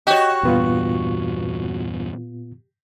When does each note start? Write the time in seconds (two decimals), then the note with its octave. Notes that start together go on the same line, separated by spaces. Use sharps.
0.07 F#4 G4 C#5 D#5
0.43 E2 G2 A#2 B3 F4